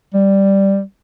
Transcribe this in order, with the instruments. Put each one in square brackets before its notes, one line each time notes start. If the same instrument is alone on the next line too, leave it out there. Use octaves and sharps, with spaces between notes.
[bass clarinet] G3